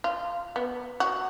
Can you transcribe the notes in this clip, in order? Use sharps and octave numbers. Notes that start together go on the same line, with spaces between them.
F4
B3
F#4